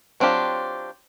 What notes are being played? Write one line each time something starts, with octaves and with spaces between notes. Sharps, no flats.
F#3 C4 D4 F4 G4